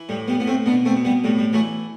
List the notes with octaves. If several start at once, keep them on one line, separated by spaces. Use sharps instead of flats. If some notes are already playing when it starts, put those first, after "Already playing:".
Already playing: E3
A2 G3
G3 B3
A2 B3
A3 C4
B2 B3 D4
A3 C4
B2
G3 B3
A2 G3
G3
E3 F#3 A3